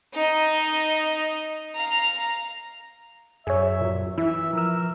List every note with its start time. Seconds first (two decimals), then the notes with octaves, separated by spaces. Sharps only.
0.13 D#4 D#5
1.74 F5 A#5
3.47 F#2 G#4 C#5 E5
3.81 A#2 F#3
4.18 E3 E4 E5
4.53 F3 A#4 E6